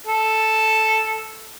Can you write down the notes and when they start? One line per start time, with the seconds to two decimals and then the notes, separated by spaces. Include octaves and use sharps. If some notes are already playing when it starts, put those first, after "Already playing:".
0.07 A4